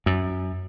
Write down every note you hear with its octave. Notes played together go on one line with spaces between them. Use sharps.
F#2